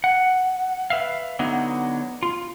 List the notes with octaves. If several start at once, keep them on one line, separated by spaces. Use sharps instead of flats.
F#5
B4 E5 F5
D3 F#3 B3 D#4
F4